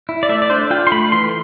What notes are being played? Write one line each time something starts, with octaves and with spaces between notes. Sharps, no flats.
E4
D5
A3 E5
D5
D4 C5
F4 G5
C6
A3 B5
E3 C6